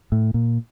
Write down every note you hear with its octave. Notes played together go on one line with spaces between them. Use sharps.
A2
A#2